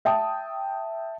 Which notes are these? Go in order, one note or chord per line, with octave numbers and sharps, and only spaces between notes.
E5 G5 A5 D#6